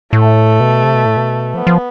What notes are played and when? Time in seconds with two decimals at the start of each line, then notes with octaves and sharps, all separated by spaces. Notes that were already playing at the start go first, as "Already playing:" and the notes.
0.13 A2 A3
0.60 B2
0.84 C3
0.95 B2
1.06 A2
1.17 B2
1.54 F3 B3
1.67 F3